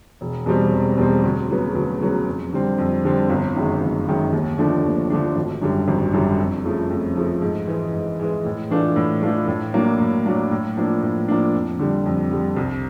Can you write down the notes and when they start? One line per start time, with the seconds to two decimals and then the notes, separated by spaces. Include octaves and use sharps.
0.21 E1
0.46 E2 B2 G3 C4
0.72 E1
0.98 E2 B2 G3 C4
1.24 D2
1.50 C#3 F#3 B3
1.75 D2
2.01 C#3 F#3 B3
2.27 F2
2.53 D3 G3 C4
2.78 F2
3.04 D3 G3 C4
3.30 G1
3.56 F#2 D#3 G#3
3.81 G1
4.07 F#2 D#3 G#3
4.33 D#2
4.58 D3 F3 A3 D4
4.84 D#2
5.10 D3 F3 A3 D4
5.36 G#1
5.62 F#2 D3 G3
5.88 G#1
6.13 F#2 D3 G3
6.39 F2
6.64 C#3 F3 A3
6.90 F2
7.16 C#3 F3 A3
7.41 G#2
7.67 E3 G#3
7.94 G#2
8.20 E3 G#3
8.45 A2
8.71 E3 A3 D4 F4
8.96 A2
9.22 E3 A3 D4 F4
9.48 A2
9.74 F#3 A#3 D4
10.00 A2
10.26 F#3 A#3 D4
10.51 A2
10.77 F3 A#3 D4
11.02 A2
11.28 F3 A#3 D4
11.54 F2
11.79 D3 G3
12.06 F2
12.31 D3 G3
12.57 C2